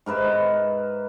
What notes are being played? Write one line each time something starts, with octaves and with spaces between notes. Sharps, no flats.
G#2 A#4 B4 E5